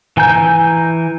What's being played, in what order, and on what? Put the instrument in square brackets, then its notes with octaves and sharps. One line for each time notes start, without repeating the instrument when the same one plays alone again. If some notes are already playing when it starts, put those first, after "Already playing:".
[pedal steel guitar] E3 G#5 A#5 G6